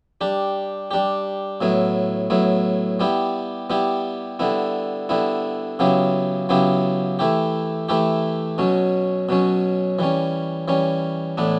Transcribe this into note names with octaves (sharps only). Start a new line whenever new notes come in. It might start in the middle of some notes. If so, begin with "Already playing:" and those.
G3 D4 G4
G3 D4 G4
A2 F#3 B3 E4
A2 F#3 B3 E4
G3 B3 E4 G4
G3 B3 E4 G4
D3 G3 B3 E4
D3 G3 B3 E4
C#3 F#3 B3 E4 G4
C#3 F#3 B3 E4 G4
E3 A3 E4 G4
E3 A3 E4 G4
B2 F#3 C#4
B2 F#3 C#4
E3 G3 C#4
E3 G3 C#4
A2 E3 B3 D4